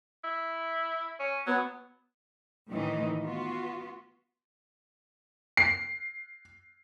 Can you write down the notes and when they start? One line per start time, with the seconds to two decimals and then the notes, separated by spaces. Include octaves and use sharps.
0.24 E4
1.20 C#4
1.47 F#3 B3
2.70 A2 D#3 E3 D#4
3.22 B3 F4 F#4
5.57 C7